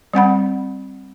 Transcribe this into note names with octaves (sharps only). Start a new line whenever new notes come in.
G3 C4 F#5 B5